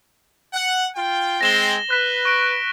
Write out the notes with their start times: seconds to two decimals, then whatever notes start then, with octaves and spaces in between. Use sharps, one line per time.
0.54 F#5
0.96 F4 G5
1.41 G#3 C4 A#6 E7 G7
1.91 B4 F#6 B6 E7
2.25 C#6 A#6 D7